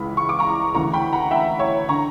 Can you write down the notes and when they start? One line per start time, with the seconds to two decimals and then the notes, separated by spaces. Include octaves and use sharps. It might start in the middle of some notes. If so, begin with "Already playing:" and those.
Already playing: C#2 C#3 E3 B5
0.17 C#6
0.29 D6
0.39 A#5 C#6
0.74 D2 C#3 E3 A#5 C#6
0.94 G5 B5
1.13 F#5 A#5
1.31 E5 G5
1.59 C#5 E5
1.89 D3 A#5 C#6